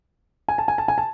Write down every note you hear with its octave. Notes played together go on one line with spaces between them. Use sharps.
G#5
A5
G#5
A5
G#5
A5